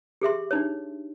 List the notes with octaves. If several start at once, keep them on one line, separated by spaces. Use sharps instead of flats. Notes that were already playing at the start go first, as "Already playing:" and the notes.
G4 G#4 E5 C6
D4 D#4 C#5